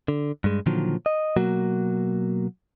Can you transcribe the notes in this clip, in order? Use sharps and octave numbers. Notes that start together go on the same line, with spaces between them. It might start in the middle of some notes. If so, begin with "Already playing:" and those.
D3
G2 G#3
A#2 D3 D#3 F3 F#3
D#5
B2 F#3 A#3 F#4